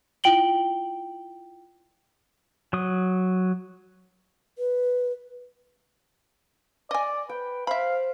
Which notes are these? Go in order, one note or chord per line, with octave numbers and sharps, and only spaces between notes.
E4 F4 G5 D7 F#7 G7
F#3 D#6
B4
D5 D#5 G#5
B4 G5
C5 E5 F5 B5